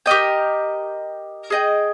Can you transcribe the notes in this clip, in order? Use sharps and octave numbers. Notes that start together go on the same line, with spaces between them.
G4 A#4 D#5 G5
G#4 D#5 G5